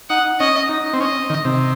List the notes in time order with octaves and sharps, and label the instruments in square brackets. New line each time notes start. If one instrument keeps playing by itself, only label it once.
[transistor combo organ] D#4 [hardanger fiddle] F#5
[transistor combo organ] C#4 [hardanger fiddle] D#5
[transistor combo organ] D#4
C4
[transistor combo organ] C#4 [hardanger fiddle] D#5
[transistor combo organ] D#3
C3